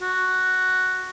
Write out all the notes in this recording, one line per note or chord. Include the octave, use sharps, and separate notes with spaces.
F#4